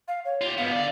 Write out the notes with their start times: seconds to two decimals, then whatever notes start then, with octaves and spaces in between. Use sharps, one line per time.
0.08 F5
0.25 C#5
0.42 F4 G4
0.58 G#2 B3 F5
0.71 D3 D5